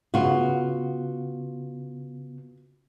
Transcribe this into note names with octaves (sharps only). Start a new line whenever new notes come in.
C#3 B3 F4 F#4